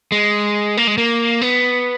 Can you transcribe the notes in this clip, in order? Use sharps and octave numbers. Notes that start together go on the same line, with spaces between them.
G#3
A#3
G#3
A#3
B3